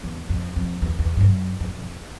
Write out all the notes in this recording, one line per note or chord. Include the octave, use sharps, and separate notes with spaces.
E2
F2
F2
E2
E2
G2
F#2
F2
F#2
F2